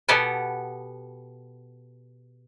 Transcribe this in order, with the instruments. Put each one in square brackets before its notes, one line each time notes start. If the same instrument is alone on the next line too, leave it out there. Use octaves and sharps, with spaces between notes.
[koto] B2 B3 G4 A4 F#5 G#5